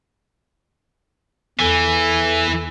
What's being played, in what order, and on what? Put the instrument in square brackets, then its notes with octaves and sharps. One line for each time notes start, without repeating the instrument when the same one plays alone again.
[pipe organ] E2 A4 G#5 [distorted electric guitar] E3